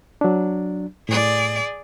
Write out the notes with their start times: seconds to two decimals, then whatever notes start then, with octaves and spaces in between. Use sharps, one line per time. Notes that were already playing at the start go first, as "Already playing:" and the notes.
0.21 F#3 D4
1.09 A2 G#4 D5